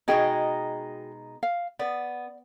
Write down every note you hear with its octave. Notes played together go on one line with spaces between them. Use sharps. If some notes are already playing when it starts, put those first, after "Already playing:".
B2 G#3 D#4 F#4 G#4 G5
F5
B3 D5